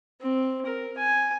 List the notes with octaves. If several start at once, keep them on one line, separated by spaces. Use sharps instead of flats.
C4
A#4
G#5